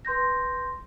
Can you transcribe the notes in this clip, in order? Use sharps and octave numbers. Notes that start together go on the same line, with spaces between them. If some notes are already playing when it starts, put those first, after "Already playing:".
B4 C6 G6 A#6